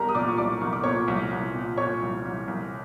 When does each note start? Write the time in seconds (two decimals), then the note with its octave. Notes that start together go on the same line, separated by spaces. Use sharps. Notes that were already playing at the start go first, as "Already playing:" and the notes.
Already playing: C2 G3 A#4 A#5
0.09 D#6
0.15 A#2 D5 D6
0.28 C#6
0.38 C2 D5 D6
0.61 C2 C#6
0.73 D6
0.84 A#2 C#5 C#6
1.08 C2
1.31 C2
1.54 A#2
1.77 A#2 C#5 C#6
2.02 C2
2.25 C2
2.48 C2